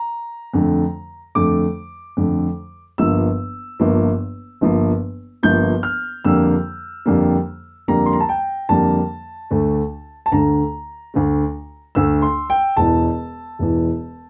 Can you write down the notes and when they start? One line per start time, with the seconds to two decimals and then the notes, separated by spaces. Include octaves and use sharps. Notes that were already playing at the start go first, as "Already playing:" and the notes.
Already playing: A#5
0.54 F2 D3 A3
1.35 F2 D3 A3 D6
2.17 F2 D3 A3
2.98 G1 G2 F3 A#3 E6
3.80 G1 G2 F3 A#3
4.61 G1 G2 F3 A#3
5.43 G1 G2 F3 A#3 G6
5.83 F6
6.25 F2 D3 G3 A#3 E6
7.06 F2 D3 G3 A#3
7.88 F2 D3 G3 A#3 A#5
8.06 C6
8.13 A#5
8.20 A5
8.29 G5
8.69 F2 D3 G3 A#3 A5
9.51 D2 D3 A3
10.26 A5
10.32 D2 D3 A3 A#5
11.14 D2 D3 A3
11.95 D2 D3 A3 E6
12.22 C6
12.50 G5
12.77 E1 E2 E3 A5
13.59 E1 E2 E3